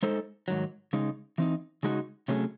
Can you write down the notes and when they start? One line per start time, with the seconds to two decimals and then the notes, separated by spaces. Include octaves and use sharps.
0.03 G#3 D#4 A4 C5
0.48 G#2 D#3 F#3
0.93 C#3 G#3 D#4
1.38 E3 C4 D#4
1.83 C#3 G#3 D#4 F#4
2.28 C3 F#3 A3 C#4 G#4